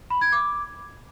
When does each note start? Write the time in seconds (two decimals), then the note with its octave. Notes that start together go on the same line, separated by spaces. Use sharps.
0.10 B5
0.21 G#6
0.32 D6